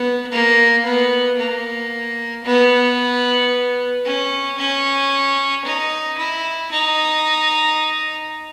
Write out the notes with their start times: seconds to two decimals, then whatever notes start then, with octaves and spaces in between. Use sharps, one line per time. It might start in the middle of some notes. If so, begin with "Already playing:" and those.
Already playing: B3
0.32 A#3
0.85 B3
1.38 A#3
2.44 B3
4.05 C#4
4.58 C#4
5.65 D#4
6.17 E4
6.71 D#4